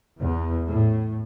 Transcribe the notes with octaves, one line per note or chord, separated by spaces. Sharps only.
E2
A2